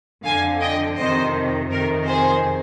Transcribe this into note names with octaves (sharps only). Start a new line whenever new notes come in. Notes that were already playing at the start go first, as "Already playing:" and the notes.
F2 D3 F5 G#5
D#5 G5
F2 C3 D#3 C5 D#5
F2 C3 D#3 A#4
G#4 C5